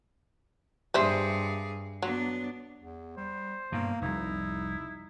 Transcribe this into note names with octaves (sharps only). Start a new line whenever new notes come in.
G2 G3 G#4 C5 E5
F#3 B3 D4
E2
G3 C5
G2 B2 A#3
F1 C2 D#4 E4